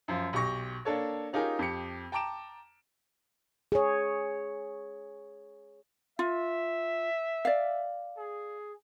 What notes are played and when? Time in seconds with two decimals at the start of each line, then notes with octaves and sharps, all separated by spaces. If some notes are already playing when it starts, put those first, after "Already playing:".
0.08 F#2 F3
0.33 B1 G4 C#6 A#6
0.85 A#3 D4 A4 C#5
1.33 C#4 D#4 F4 G4 G#4 A#4
1.59 F2 G4 C#7
2.12 G5 A5 A#5 D6 D7 E7
3.72 G#4 C#5
6.19 F4 E5
7.45 D5 F5
8.17 G#4